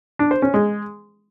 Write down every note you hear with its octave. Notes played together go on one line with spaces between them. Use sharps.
D4
C5
C#4
G#3